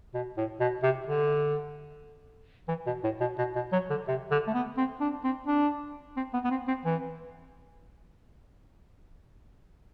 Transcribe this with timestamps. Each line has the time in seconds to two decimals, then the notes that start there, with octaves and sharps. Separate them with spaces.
0.14 B2
0.37 A2
0.60 B2
0.83 C3
1.07 D3
2.68 E3
2.86 B2
3.04 A2
3.21 B2
3.38 B2
3.56 B2
3.72 F#3
3.90 D3
4.08 C3
4.31 D3
4.47 A3
4.55 B3
4.77 C4
5.01 D4
5.24 C4
5.47 D4
6.17 C4
6.34 B3
6.44 B3
6.51 C4
6.68 C4
6.85 E3